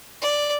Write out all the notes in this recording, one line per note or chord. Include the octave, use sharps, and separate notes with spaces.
D5